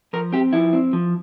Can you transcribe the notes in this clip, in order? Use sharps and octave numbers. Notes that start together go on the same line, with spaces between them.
F3 A#4
C4 G4
F3 E4
C4
F3